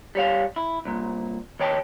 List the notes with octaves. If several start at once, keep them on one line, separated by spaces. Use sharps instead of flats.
G3 C#5 F5
E4
C2 A#2
D#3 C#5 G5 A5